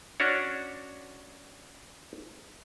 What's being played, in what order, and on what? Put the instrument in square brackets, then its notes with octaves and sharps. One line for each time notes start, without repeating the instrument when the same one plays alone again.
[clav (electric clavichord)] C#4 D4 F#4 C#5